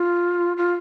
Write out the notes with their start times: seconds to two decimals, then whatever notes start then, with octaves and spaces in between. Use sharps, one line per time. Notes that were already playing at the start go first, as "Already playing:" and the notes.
Already playing: F4
0.57 F4